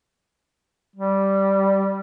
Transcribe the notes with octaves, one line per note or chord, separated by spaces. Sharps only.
G3